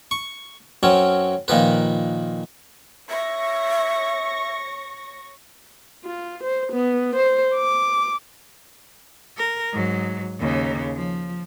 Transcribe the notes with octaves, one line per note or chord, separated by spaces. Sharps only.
C#6
F#2 F#3 C4 C#4
A#2 D#3 F3 B4
C#5 E5 C#6 A#6
F4
C5
B3
C5
D6
A#4
G#2 F#3
D#2 C#3
F3